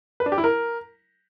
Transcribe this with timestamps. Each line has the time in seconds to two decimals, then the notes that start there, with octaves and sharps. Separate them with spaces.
0.20 B4
0.26 D4
0.32 G4
0.38 E4
0.44 A#4